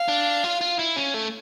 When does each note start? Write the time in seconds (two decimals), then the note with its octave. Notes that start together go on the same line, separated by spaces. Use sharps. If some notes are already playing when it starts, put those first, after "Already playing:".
Already playing: F5
0.08 D4
0.44 F4
0.61 F4
0.79 E4
0.96 C#4
1.14 A3